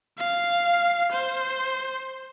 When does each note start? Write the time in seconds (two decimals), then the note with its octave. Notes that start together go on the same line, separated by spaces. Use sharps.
0.18 F5
1.12 C5